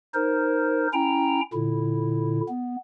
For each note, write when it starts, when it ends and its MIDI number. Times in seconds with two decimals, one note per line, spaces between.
0.14 0.87 63
0.14 0.87 70
0.14 0.87 72
0.93 1.41 61
0.93 1.41 64
0.93 1.41 79
0.93 1.41 82
1.53 2.41 46
1.53 2.41 50
1.53 2.41 64
2.49 2.76 59